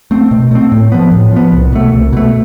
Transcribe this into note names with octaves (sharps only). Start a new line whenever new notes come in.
A3 C4
B2
A3 C4
A2
F3 B3
A2
F3 B3
C2
B2 A3
C2
B2 A3